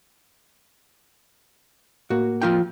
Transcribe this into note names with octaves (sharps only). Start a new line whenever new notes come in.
A2 A#3 F#4
F3 F4 G5